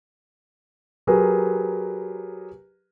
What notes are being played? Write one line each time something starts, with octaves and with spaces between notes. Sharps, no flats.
F#3 G4 G#4 A#4 B4